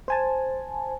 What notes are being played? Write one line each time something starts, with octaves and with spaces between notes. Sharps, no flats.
C5 G#5 A5